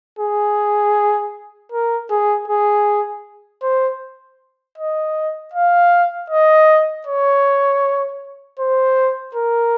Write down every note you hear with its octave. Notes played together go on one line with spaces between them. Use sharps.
G#4
A#4
G#4
G#4
C5
D#5
F5
D#5
C#5
C5
A#4